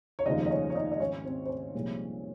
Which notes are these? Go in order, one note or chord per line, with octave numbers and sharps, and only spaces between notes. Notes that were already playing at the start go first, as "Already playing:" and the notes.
C#5
F1 D#2 C#3 F3 G#3 D#4 D#5
D#5
C#4 C#5
C#5
D#4 D#5
D#5
G#1 G#2 D#3 C#4 C#5
C4 C5
C5
C#4 C#5
C2 A#2 F3 G#3